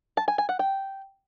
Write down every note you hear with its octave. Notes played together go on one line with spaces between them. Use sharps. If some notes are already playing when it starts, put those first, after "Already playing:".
A5
G#5
G#5
F#5
G5